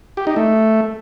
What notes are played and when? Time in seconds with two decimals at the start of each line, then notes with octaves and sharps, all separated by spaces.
0.17 G4
0.27 D#4
0.36 A3